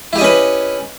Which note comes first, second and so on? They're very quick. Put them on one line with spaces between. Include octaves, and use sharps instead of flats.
E4 G4 D#5 C#4 B4